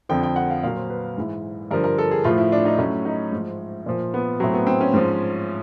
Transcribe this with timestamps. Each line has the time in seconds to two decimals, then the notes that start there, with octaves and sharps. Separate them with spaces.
0.09 F2 D3 F3 G5
0.23 G5
0.36 F#5
0.50 F5
0.63 A#2 F#3 F5
0.77 C5
0.90 B4
1.18 G#2 E3
1.71 G2 D3 F3 A#4
1.84 A#4
1.98 A4
2.11 G#4
2.24 A2 F3 F4
2.38 E4
2.52 D4
2.65 D#4
2.78 A2 F#3 C#4
3.05 D#4
3.32 G#2 F3
3.86 A#2 F3
4.14 B3
4.40 A2 F#3 C4
4.54 B3
4.67 C4
4.81 C#4
4.93 G#2 F3